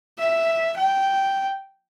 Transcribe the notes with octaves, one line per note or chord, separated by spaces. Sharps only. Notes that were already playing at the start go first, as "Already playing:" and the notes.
E5
G5